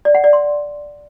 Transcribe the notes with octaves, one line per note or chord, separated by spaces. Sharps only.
D5
F#5
D5
C6